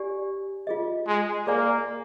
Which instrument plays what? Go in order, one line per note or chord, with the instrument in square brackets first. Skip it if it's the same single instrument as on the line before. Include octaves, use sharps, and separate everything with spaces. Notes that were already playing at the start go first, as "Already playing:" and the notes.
Already playing: [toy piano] G4 D5 G#5
F4 G#4 D#5
[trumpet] G#3
[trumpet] A#3 [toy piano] G#4 D5 G#5